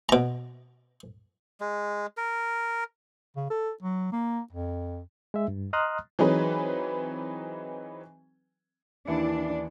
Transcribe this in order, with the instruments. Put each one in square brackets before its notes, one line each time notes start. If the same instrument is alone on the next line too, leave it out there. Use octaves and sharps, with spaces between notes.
[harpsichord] B2 A#5
[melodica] G#3
A#4
[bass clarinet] C#3
A4
F#3
A#3
F2
[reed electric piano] G#3 E5
G2
D#5 A#5 C6 D#6 F6 F#6
[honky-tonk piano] E3 F#3 C4 D#4 G#4 B4
[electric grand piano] D#2 E3 C#7 [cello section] D4 [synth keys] E4